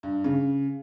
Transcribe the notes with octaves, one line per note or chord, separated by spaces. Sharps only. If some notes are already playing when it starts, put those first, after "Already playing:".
G2
C#3